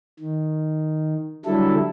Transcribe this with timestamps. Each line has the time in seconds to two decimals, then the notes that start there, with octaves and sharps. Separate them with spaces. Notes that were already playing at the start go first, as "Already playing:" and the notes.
0.20 D#3
1.46 D3 F#3 G3 E4 A4